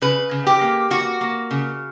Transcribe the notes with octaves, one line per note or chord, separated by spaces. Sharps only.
C#3 B4
C#3
G4
A#3
A#3 F#4
A#3
C#3